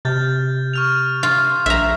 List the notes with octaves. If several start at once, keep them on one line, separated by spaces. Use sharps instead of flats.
C3 F6 G6 A6
C#6 F6 F7
F4 C7
A#1 E5 A#5